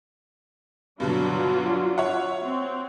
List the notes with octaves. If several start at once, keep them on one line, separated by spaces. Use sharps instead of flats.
G2 B2 D3 F#3 D4 F4
C#5 E5 F#5
C4